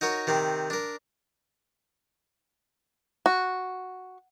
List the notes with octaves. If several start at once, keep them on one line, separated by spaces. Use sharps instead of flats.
D#4 F#4 A#4 C#5
C3 D#3 C4
D4 A#4
F#4